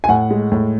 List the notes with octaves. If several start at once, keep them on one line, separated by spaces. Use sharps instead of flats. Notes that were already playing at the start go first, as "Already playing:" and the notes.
G#5
A2 F#5
G#3
A2